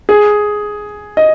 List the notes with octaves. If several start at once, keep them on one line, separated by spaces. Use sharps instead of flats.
G#4
D#5